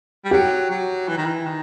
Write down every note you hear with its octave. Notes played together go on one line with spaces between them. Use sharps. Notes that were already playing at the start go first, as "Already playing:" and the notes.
G3
F#3 G4
F#3
E3
D#3
E3
D#3